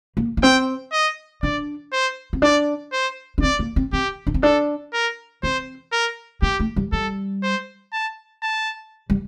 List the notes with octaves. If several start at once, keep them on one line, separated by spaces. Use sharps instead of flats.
A#3
A#3
C4 G5
D#5
D4 D5
C5
C4
D4 D5
C5
D4
C4 D5
A#3
C4
C4 G4
D4
C4
D4 A4
A#4
C4 C5
A#4
A#3 G4
A3
G3
G3 A4
C5
A5
A5
G3